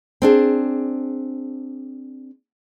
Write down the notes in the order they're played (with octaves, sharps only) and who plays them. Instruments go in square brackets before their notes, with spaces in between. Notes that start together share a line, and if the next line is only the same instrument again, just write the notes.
[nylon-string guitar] C4 D4 G#4